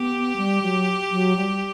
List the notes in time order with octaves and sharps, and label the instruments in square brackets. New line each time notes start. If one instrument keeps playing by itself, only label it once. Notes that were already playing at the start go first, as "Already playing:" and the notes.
Already playing: [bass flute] B3 [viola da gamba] G4
[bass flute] G3
F#3
F#3
G3